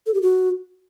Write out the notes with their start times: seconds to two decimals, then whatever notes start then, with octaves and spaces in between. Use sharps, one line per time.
0.06 A4
0.14 G4
0.22 F#4